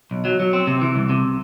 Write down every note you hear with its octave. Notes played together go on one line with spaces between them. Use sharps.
B1
F#3
F#3
C4
C3
E3
C2
C3